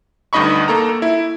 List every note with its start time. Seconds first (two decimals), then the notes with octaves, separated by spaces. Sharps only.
0.33 D2 G2 D#4 D#5 B5 C#6
0.68 A#3 A4 A#5
1.02 E4